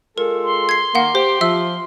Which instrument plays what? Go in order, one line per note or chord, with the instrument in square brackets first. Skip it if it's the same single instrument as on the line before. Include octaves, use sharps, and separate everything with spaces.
[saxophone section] G#3 F4 A4 [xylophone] A#4
[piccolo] C6
[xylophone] G#6 C7
[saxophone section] D#3 A#3 [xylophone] F5 F#5
[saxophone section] G4 [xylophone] C5
[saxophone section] F3 [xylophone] E5 E6